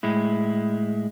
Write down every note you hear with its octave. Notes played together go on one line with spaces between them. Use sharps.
A2 G#3 E4